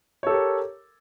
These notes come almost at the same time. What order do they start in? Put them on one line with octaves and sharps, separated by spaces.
C#5 A4 G4 A#4